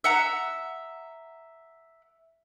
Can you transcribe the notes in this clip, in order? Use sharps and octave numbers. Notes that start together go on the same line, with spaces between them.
E5 F#5 A#5